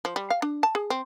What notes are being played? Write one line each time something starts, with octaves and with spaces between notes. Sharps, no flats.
F3
G3
F5
D4
A5
G#4
C4